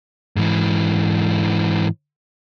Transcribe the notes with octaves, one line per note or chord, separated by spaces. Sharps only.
G#2 E3